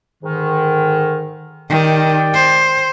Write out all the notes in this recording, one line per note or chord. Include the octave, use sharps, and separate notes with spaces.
G#2 D3 D#3
D#3 G4 D5 G5
C5